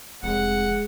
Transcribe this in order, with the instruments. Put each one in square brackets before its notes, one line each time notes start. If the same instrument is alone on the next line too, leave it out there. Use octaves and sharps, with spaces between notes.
[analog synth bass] F1 [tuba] G#3 [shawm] F#5